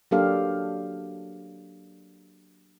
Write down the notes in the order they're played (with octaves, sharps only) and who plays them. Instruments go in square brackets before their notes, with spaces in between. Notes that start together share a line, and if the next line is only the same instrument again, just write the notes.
[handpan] F#3 A#3 D4 G4 A4 F5